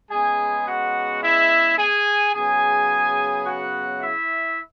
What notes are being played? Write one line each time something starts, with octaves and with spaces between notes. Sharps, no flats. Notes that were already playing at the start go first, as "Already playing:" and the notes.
C#3 G#3 B3 G#4 G#5
F#4 F#5
E4 E5
G#4 G#5
C#3 F#3 B3 G#4 G#5
F#4 F#5
E4 E5